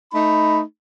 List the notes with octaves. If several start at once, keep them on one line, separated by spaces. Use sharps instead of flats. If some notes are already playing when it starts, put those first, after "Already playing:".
A3 D#4 B5